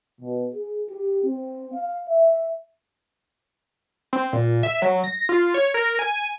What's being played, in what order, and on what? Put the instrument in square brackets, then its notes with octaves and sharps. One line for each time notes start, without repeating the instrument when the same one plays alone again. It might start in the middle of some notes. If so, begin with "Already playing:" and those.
[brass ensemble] B2
G#4
G4
C4
F5
E5
[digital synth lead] C4
A#2
E5
F#3
A#6
F4
C#5
A#4
G#5